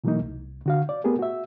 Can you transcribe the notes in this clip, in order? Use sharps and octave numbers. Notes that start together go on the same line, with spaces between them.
B2 E3 F#3 A3 A#3 D#4
C2
D3 F#4 F5
D5
A3 B3 G4 G#4 A#4
F#4 E5